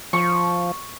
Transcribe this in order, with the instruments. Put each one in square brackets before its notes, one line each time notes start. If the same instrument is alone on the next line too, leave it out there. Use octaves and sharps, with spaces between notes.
[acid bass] F3 [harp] C#6